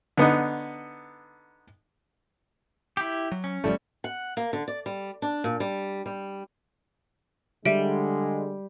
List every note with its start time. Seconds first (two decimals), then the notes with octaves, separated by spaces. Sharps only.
0.17 D3 B3 D#4
2.97 E4 G4
3.32 F#3
3.44 C#4
3.64 G#1 F3 G3 A3
4.04 F#5
4.37 A#3
4.53 D3
4.68 D5
4.86 G3
5.22 D4
5.44 A#2
5.60 G3
6.06 G3
7.65 D3 G3 G#3 E5 D7